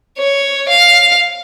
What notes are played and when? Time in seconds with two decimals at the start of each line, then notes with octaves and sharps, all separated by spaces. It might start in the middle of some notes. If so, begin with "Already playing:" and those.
0.18 C#5
0.69 F5